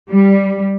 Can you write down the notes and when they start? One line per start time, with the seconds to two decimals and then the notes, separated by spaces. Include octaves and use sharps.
0.10 G3